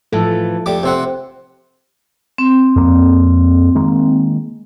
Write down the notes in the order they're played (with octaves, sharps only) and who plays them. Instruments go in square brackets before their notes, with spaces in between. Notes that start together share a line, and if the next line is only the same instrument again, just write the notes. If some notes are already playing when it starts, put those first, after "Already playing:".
[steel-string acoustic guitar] A2 E3 F4 [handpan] F3 A4
[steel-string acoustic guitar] F2 A3 [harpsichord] G3 D6
[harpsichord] C3 C4 F#5
[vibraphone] C4
[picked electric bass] F2 A#3
D#3 G#3 A#3